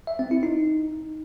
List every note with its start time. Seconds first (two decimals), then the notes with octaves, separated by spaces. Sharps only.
0.07 E5
0.19 C4
0.31 E4
0.43 D#4